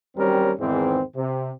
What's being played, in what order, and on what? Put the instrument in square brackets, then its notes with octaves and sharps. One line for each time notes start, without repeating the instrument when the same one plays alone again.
[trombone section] D#2 F#3 G3 C4 C#4 A#4
E2 G#2 D#3 E3 C4
C3